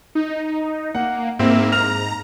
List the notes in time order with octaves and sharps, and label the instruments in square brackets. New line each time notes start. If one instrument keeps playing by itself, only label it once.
[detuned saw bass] D#4
[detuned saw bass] A#3 [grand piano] F#5
[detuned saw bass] G#2 [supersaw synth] A#3 [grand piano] C4 E4
[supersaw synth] A#5 [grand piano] F6 F7